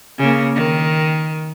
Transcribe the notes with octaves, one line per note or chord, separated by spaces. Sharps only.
C#3 A#3
D#3